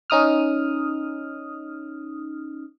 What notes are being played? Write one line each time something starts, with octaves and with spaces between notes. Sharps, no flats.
C#4 D#4 D#6 F6